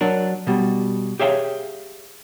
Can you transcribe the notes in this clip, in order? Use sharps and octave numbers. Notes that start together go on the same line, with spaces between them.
F#3 D4 A#4
B2 G3
G4 G#4 C#5 E5 F5 G5